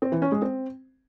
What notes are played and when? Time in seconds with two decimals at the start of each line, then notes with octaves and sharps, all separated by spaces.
0.02 C4
0.12 E3
0.22 C#4
0.32 G#3
0.42 C4